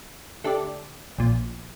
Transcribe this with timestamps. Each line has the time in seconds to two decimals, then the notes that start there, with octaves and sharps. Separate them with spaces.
0.44 D3 A3 D4 G4 D5
1.18 A#1 A#2 F3